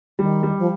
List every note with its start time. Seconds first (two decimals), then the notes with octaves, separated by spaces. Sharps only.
0.19 D#3 G3
0.43 G3
0.59 F3